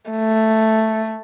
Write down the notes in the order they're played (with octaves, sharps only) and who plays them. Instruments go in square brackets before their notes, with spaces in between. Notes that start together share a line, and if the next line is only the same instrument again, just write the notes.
[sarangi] A3